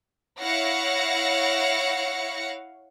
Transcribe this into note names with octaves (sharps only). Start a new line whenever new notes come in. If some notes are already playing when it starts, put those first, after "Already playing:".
E4 C#5 F5 F#5 A#6 C#7